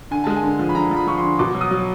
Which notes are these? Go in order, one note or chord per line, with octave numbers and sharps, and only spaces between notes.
D3 G#5
G#3 A5
G#5
D3
F3
B5
D3 A#5
F3
B5
F3 C#6
C6
D3
B2 D6
F#3
D#6
F#3